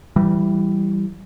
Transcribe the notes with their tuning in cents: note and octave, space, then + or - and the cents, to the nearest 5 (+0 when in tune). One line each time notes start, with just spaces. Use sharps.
E3 +10 G3 -10